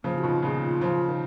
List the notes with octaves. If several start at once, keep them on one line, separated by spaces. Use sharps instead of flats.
C#3 F3 A#3
F#4
B2 D#3 F4
A#2 C#3 G#4
F4
C#3 F3
D#3